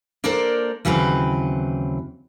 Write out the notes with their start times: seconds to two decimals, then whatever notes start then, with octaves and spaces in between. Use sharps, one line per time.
0.24 A#3 D4 A4 A#4 C5 D5
0.85 D#2 C#3 E3 F#3 C4 B4